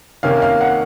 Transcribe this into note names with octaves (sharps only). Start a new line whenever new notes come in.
C3 D#3 A#3 C#4 F5
F5
F#5